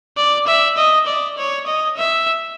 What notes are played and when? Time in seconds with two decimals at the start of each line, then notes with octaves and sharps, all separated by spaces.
0.17 D5
0.47 E5
0.77 D#5
1.07 D5
1.38 C#5
1.67 D#5
1.97 E5